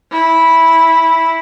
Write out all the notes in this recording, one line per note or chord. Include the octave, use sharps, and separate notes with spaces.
E4